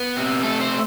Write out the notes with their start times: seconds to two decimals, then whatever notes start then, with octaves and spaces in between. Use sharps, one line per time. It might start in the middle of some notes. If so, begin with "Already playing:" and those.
Already playing: B3 B4
0.17 C3
0.43 A3 A4
0.61 C5